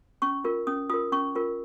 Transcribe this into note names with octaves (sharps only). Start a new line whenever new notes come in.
C#4 C#6
F4 A#4
C#4 D#6
F4 A#4 D#6
C#4 C#6
F4 A#4